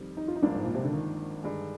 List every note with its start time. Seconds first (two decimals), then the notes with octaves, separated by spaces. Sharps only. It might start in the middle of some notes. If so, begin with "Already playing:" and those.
Already playing: F2 D#3 G3 C4
0.17 D#4
0.28 F4
0.36 D#4
0.42 G#1 G2 F3 A#3 D4
0.55 G#2
0.65 A#2
0.75 C3
0.84 D3
0.93 D#3
1.43 G2 D3 G#3 D#4 G#4